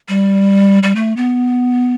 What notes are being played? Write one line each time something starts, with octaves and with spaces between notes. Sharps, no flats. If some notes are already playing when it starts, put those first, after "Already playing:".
G3
G3
A3
B3